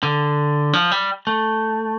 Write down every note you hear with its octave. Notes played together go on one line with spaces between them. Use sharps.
D3
F3
G3
A3